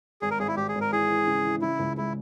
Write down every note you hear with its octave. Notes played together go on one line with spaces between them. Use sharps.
G#1 G#4
A#4
G#1 G#4
E4
G#1 G4
G#4
G#1
A#4
E3 G#4
E3
C#3
E3
C#3 E4
C#2
G#3 E4